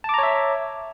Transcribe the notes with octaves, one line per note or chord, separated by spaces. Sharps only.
C#5 E5 A5 A#5 D6